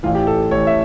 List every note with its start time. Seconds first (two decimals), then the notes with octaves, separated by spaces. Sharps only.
0.03 A1 A2 E3 F4
0.15 G4
0.27 A4
0.51 A1 A2 E3 C#5
0.67 E5